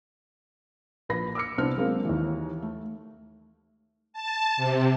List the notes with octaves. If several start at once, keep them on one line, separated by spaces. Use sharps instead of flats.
A#1 B4 B5 A#6
D6 E6 F6 C#7
C2 B3 D4 C5 F6
F#3 G#3 A#3 C4 D4
D#2 E3
A3
A5
C3